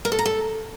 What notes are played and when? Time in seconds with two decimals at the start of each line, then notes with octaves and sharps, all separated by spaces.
0.05 A#4
0.12 A4
0.19 A#5
0.25 A4